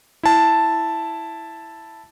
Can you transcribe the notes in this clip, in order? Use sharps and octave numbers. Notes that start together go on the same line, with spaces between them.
E4 A5